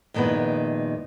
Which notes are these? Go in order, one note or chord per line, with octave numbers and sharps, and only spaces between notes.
F2 A#2 D#3 G#3 B3 E4